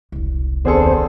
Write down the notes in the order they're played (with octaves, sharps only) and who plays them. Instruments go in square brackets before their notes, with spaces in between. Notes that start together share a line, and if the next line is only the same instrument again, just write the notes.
[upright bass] E1 C2
[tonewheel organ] D#2 C4 C5 [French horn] B3 [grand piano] D4 G#4 A4